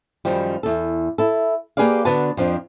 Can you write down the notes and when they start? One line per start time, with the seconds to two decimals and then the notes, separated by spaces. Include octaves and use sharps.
0.25 F#2 D#3 F3 G3
0.63 E2 A4
1.18 E4 A4
1.77 A#3 G4 G#4 B4 D5 F5
2.05 D3 B3 D4 F#4 B4 A5
2.37 F2 F3 D4